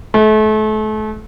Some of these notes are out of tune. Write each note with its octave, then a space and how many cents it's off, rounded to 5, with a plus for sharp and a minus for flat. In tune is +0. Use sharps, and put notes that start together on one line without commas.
A3 -35